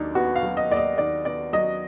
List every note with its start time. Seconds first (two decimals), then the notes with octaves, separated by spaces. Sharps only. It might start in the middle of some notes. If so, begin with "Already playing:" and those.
Already playing: D#2 D#3 F#3 D4 D#4
0.15 B3 F#4
0.35 F5
0.43 F#3
0.57 D#5
0.70 D#2 D5
0.77 D#5
0.98 D#3 D5
1.25 B3 D5
1.53 F#3 D#5